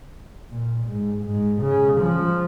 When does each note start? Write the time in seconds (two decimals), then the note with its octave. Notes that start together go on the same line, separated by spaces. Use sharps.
0.50 A#2
0.87 G#2
1.25 G#2
1.62 C#3
2.01 F3